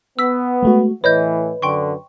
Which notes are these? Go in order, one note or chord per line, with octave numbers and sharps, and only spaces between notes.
B3 E6 B6
G#3 A3 F#4
A2 E3 B4 C#5 D#5 G6
F#2 D3 G5 C6 C#6